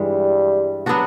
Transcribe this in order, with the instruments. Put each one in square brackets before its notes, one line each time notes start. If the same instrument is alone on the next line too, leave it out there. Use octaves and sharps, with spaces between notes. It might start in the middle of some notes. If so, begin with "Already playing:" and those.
Already playing: [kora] G2 E3 G#3 [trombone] G3
[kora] F#3 B3 D4 F#4